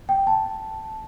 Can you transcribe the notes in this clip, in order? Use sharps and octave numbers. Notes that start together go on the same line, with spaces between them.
G5
A5